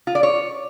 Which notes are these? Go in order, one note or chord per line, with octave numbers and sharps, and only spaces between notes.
F4
D5
C#5